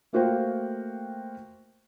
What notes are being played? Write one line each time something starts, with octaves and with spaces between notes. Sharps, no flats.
A3 A#3 F#4 C5 F5 G5